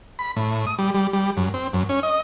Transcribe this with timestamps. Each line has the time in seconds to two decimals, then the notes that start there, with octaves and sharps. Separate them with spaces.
0.19 B5
0.36 A2
0.67 D#6
0.79 G3
0.94 G3
1.13 G3
1.37 F#2
1.54 C4
1.73 F#2
1.89 C#4
2.03 D#5